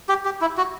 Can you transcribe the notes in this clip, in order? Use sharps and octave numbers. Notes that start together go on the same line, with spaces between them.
G4
G4
E4
F#4